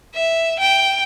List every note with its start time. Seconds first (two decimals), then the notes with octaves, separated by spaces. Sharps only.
0.15 E5
0.60 G5